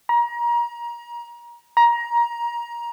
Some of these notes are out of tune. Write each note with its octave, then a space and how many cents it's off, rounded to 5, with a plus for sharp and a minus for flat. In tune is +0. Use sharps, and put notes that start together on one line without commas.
A#5 +30
A#5 +20